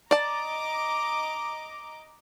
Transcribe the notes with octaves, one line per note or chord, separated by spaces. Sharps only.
D5 D#5 A5 A#5 D6